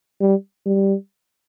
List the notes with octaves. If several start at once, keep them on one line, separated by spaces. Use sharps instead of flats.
G3
G3